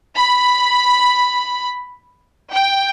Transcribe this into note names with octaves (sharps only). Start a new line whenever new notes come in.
B5
G5